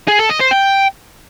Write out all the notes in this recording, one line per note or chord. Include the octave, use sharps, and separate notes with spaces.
G#4
A4
D#5
C5
G5